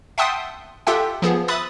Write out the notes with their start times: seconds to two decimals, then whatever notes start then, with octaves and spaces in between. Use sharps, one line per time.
0.18 E5 F#5 G5 A5 C6 D#6
0.87 F4 G4 A4 E5 F#5 G5
1.22 F3 B3 G#4
1.48 E5 B5 D#6 F#6 A6